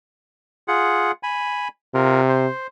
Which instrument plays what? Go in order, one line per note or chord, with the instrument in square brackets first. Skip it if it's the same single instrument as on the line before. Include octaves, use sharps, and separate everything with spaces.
[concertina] F4 G#4 F#5
G#5 B5
[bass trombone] C3 [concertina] F4 A#4
[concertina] C5